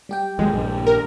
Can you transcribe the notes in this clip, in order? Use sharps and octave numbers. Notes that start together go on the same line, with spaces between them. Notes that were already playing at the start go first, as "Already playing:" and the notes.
G3 G4 G5
D#2 F3 F#3 G#3
A#1 G2
A#4